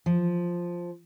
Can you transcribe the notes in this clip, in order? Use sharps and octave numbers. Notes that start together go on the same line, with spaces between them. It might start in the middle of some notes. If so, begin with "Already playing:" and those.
F3